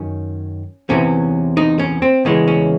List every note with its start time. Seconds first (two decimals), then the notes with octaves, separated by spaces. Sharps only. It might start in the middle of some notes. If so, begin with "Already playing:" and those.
Already playing: F#2 D#3 C#4
0.90 E2 C3 E3 C#4
1.57 D#4
1.79 C#4
2.02 C4
2.25 E2 C#3 E3 G#3 C#4
2.48 C#4